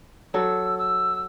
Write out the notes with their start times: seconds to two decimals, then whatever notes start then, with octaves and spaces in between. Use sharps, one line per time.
0.34 F#3 A4 E6
0.78 E6